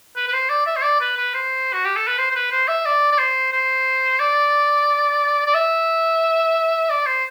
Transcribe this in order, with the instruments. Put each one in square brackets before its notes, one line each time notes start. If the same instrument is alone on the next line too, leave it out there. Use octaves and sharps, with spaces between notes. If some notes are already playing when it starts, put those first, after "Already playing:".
[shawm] B4
B4
C5
D5
E5
C5
D5
B4
B4
C5
F#4
G4
A4
B4
C5
C5
B4
C5
E5
D5
D5
C5
C5
D5
D5
E5
D5
C5